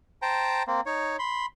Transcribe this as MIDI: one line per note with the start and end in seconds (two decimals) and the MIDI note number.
0.22 0.63 72
0.22 0.63 79
0.22 0.63 81
0.22 0.63 82
0.67 0.81 58
0.67 0.81 60
0.86 1.17 63
0.86 1.17 73
1.19 1.46 83
1.19 1.46 84